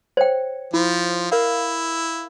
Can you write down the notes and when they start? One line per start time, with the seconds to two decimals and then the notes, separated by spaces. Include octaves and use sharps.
0.17 C5 C#5 G5
0.74 F3 E4
1.32 E4 A#4 F5